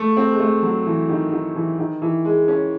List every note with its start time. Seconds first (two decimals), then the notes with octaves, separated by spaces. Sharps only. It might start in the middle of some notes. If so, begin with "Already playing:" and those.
Already playing: A3
0.17 C4
0.31 G#3
0.40 A3
0.63 F#3
0.86 E3
1.09 D#3
1.32 D#3
1.55 E3
1.78 D#3
2.02 E3
2.25 G#3
2.48 C#4